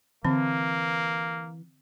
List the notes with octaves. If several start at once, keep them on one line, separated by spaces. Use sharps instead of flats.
D3 E3 A#3 C4